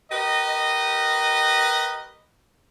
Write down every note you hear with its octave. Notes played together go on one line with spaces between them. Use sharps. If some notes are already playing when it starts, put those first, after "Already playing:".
G4 A#4 B4 D#5